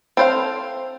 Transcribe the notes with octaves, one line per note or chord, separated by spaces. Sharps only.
C4 A4 C5 C#5 F5